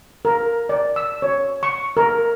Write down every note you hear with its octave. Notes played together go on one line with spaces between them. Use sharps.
A#4
D5
E6
C#5
C#6
A#4